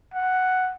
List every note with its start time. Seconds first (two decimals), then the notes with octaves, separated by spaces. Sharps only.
0.14 F#5